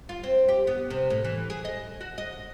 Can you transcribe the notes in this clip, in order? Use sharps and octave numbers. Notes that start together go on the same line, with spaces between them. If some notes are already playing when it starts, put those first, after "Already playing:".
F4
C4
G4
B3
C3
A2
E3
G#4
D#5
F#4
D#5